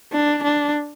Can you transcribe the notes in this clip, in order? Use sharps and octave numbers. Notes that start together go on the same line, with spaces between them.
D4
D4